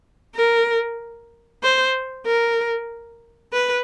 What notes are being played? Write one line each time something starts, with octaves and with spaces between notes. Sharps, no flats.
A#4
C5
A#4
B4